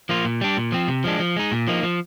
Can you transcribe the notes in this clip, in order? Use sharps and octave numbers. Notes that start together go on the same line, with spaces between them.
F3 A#3 F4
A#2
G3 D4
A#2
F3 C4
C3
F3 G#3 D4
F3
G#3 D#4
A#2
F3 A#3 D#4
F3